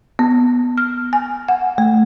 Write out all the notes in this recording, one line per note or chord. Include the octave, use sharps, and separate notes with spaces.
B3
F6
G#5
F#5
A3